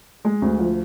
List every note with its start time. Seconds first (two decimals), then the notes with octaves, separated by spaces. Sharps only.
0.25 G#3
0.42 D2
0.59 F3